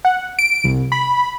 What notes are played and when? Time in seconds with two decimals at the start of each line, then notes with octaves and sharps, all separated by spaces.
0.05 F#5
0.39 D7
0.64 C2
0.92 B5